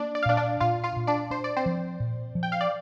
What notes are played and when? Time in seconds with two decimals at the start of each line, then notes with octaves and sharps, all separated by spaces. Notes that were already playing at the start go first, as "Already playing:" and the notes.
Already playing: A#3 D4 D5
0.15 D5
0.23 F5
0.26 A#2 D4 D5
0.37 D4 D5
0.60 A#2 F4 F5
0.84 F4 F5
0.96 A#2
1.07 D4 D5
1.31 D4 C5
1.44 D5
1.57 C4 C5
1.66 F3
2.00 A#2
2.35 F3
2.43 G5
2.52 F5
2.61 D5